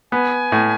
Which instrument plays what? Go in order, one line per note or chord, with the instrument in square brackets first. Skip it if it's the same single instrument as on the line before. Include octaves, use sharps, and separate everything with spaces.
[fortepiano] B3 [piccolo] G#5
[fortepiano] A2